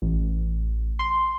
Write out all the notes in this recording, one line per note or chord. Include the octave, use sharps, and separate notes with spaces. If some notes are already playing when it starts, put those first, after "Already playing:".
A1
C6